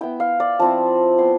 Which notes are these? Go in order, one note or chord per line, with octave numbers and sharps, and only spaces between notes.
B3 E4 G5
F5
D5
F3 C4 E4 A5
B3 E4 C6